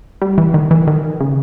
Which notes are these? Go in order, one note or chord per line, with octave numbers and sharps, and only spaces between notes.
G3
E3
D#3
E3
D#3
C#3